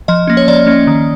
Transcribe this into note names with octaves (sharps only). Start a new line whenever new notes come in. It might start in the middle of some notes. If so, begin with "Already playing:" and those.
F3 D#5
A#3 C#4
C#5
F3 D5
A#3 C#4
D#3